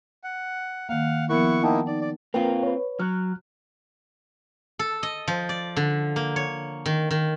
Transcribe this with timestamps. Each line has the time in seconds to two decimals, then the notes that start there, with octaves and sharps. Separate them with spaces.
0.24 F#5
0.89 D#3 A#3 F5 F#5
1.29 F3 B3 E4 A#4 F#5 C#6
1.63 A#3 D#4 E4 F#5 G5 A5
1.87 D#4 D5
2.01 D5
2.34 A#3 C4 F4 A#4 B4 G5
2.63 B4 C#5
2.99 F#3 F6 F#6
4.79 A4
5.03 D#5
5.27 F3
5.49 D5
5.76 D3
6.16 A#3
6.36 C#5
6.86 D#3
7.11 D#3